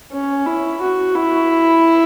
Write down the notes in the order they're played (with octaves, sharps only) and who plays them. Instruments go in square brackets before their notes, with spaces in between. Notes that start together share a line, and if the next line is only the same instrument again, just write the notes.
[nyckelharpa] C#4
E4
F#4
E4